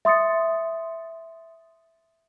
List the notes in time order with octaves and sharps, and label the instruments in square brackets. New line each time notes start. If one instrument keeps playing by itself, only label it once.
[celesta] E5 C6 D#6 A6 C#7